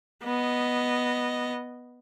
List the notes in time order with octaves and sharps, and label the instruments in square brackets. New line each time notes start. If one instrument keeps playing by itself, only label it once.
[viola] B3 D#5